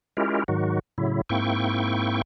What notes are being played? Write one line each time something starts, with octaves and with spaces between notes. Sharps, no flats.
G#3 C#4 E4 F4 G4 A#4
G#2 D#3 F#3 F#4
A2 C#3 F#3 E4
G#2 A#3 C4 E4 G5 C#6